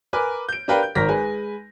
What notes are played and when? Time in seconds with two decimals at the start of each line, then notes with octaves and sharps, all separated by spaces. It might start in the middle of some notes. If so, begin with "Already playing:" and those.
0.13 A#4 B4 G#5 D6
0.49 G6 D7
0.68 D4 G4 A#4 B4 F5 G5
0.83 G6
0.95 G#1 A#4 A#6 B6
1.09 G#3 B4 G#5